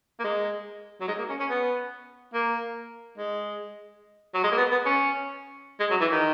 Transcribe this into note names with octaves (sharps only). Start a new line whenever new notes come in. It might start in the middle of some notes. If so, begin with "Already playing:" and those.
A#3
G#3
F#3
G#3
A#3
C#4
C#4
B3
A#3
G#3
F#3
G#3
A#3
B3
B3
C#4
G#3
F#3
E3
D#3